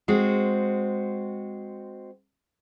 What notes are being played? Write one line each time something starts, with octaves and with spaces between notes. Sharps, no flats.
G#3 C4 F#4